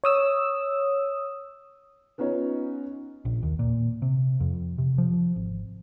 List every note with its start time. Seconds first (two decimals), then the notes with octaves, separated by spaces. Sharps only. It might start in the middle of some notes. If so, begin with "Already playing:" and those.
0.04 C#5 D#6 E6
2.18 B3 C#4 D#4 F4 C#5
3.25 A#1
3.43 D#2
3.59 A#2
4.02 C3
4.40 F2
4.78 C3
4.98 F3
5.36 G#1